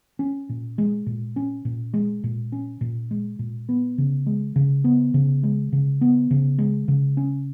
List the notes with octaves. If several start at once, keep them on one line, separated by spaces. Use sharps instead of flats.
C#4
A#2
G#3
A#2
C#4
A#2
G#3
A#2
C#4
A#2
G#3
A#2
B3
C#3
G#3
C#3
B3
C#3
G#3
C#3
B3
C#3
G#3
C#3
C#4